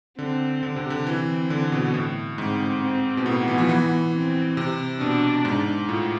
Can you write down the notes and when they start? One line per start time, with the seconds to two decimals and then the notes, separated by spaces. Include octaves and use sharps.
0.18 D3 C4
0.63 D3
0.76 C3
0.90 D3
1.06 E3 C4
1.50 D3
1.72 B2
1.88 B2
1.94 A2
2.38 G#2 C4
2.82 C4
3.17 B2
3.25 A2 B3
3.48 E3
3.58 F3
3.69 E3
4.13 C4
4.57 C3
5.00 B2 D4
5.45 G#2
5.89 A2 F4